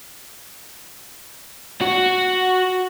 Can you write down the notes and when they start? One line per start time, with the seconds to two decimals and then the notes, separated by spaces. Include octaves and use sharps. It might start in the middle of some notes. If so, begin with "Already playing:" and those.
1.82 F#4